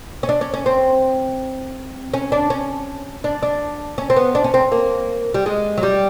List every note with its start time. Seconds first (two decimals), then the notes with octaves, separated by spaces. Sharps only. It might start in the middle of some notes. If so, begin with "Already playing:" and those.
0.23 C#4
0.29 D4
0.41 C#4
0.54 C#4
0.66 C4
2.14 C#4
2.32 D4
2.50 C#4
3.24 D4
3.43 D4
3.98 C#4
4.10 C4
4.16 B3
4.35 D4
4.44 C#4
4.54 C4
4.72 A#3
5.34 G3
5.46 G#3
5.78 F#3
5.83 G3